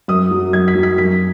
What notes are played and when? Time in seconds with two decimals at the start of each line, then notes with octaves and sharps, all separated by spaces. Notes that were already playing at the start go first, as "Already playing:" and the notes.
0.08 F#2 D#6
0.31 F#3
0.53 F#2 G#6
0.68 B6
0.75 F#3
0.83 B6
0.98 F#2 B6